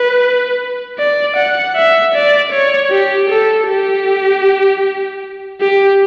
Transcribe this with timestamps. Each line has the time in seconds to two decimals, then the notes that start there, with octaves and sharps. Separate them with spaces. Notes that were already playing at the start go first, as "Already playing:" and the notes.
Already playing: B4
0.99 D5
1.36 F#5
1.76 E5
2.15 D5
2.52 C#5
2.91 G4
3.30 A4
3.68 G4
5.61 G4